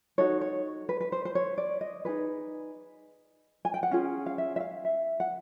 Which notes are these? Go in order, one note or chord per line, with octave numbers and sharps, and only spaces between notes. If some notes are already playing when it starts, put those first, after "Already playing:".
D#4 F#4 A4 C#5
C#5
B4
B4
C5
C5
C#5
D5
D#5
D#4 G#4 B4
G#5
G5
F#5
C#4 F4 G#4 F5
F5
E5
E5
F5
E5
F#5